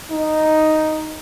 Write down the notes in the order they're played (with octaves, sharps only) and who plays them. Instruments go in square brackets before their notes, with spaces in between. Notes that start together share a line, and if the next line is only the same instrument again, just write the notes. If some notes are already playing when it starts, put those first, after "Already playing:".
[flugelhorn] D#4